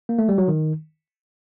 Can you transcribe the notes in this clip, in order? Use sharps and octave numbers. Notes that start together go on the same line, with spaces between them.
A#3
A3
G3
F#3
D#3